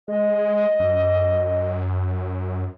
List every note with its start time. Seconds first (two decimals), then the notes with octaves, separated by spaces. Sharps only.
0.08 G#3 D#5
0.80 F#2